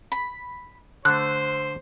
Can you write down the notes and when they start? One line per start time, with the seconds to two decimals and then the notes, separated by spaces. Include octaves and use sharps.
0.12 B5
1.05 D3 A3 C5 F#6